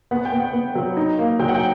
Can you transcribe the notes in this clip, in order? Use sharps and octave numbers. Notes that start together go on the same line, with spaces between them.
B3 F#5
G5
B3
F#5
B3
F#3
D#4
A#3
F#3 G5
F#5
G5